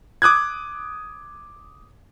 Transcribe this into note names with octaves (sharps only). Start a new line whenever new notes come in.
D6 D#6 F#6 G#6